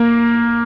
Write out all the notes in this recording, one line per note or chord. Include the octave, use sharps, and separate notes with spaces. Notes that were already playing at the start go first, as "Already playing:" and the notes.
Already playing: A#3